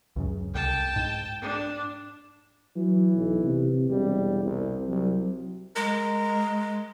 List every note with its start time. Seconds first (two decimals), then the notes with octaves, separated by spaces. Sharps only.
0.16 C#2 F#2 C#3
0.54 C2 G5 A5
0.96 G#2
1.42 D4
2.76 E3 F#3
3.14 B1
3.44 C3
3.90 E1 G3
4.43 C2
4.88 C2 F#3
5.76 G#3 A#4